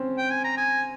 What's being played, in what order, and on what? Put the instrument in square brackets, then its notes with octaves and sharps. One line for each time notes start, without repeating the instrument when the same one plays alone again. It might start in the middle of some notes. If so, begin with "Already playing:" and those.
Already playing: [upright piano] C4 C#4 C5
[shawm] G5
G#5
A#5
G#5